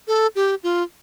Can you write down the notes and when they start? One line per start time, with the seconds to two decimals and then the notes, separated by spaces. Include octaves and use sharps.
0.08 A4
0.36 G4
0.63 F4